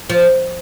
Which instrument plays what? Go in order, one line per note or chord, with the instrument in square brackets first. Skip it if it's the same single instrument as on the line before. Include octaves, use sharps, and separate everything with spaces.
[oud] F3